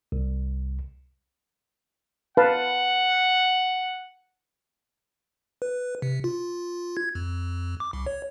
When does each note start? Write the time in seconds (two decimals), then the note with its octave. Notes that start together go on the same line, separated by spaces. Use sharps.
0.12 C2
2.37 B4 F5 F#5 A5
5.62 B4
6.02 C3
6.24 F4
6.97 G#6
7.15 F2
7.80 D6
7.93 C2
8.06 C#5